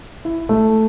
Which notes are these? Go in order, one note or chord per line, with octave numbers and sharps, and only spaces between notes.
E4
A3